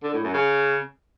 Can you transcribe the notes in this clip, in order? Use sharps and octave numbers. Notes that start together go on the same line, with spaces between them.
D3
A2
F#2
C#3